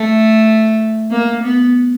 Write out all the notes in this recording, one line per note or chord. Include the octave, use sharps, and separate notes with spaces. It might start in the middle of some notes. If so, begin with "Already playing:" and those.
Already playing: A3
A#3
B3